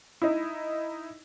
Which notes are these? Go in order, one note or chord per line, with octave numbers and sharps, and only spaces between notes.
D#4 E4